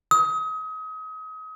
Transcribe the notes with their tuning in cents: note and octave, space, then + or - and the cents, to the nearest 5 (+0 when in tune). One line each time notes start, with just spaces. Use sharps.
D#6 +35